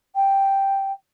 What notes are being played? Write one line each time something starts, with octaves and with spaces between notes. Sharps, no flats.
G5